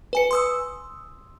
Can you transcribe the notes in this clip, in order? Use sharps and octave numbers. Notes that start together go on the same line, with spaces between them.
B4 G#5 C#7
C6 D#6 E6